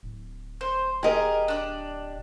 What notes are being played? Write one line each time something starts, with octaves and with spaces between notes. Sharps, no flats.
D1
C5
G4 G#4 A#4 D#5
D4 D5